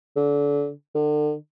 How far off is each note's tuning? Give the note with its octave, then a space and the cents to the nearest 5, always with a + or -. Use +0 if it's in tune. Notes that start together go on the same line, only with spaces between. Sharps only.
D3 -30
D3 +35